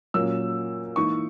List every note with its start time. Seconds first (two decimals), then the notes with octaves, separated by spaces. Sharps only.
0.14 A#2 F#3 A#3 C#4 E6
0.96 E3 A#3 D#4 C#6